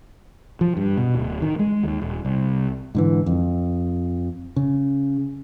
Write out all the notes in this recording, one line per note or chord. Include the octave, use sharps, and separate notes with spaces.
F3
G2
B2
D1
D#3
G#3
D#2
D#1
C2
G#2 D3 E3
F2
C#3